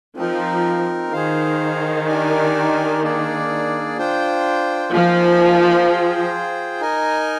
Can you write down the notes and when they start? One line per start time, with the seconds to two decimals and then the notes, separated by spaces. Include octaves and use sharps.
0.17 F3 C4 D#4 A#4
1.13 D#3 G#4 C5 F5
2.07 D4 G4 A#4 D5 G#5
3.02 A#3 D4 G#4 D5
3.97 D4 F4 C5 G5
4.91 F3 A#3 D#4 A#4 F5 G#5
5.86 F4 G#4 C5 G5
6.81 D#4 A#4 D#5 G#5